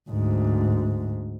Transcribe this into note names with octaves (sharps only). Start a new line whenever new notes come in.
D2 G#2